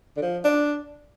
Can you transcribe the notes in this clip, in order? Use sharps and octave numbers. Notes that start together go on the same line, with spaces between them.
D3
F3
D4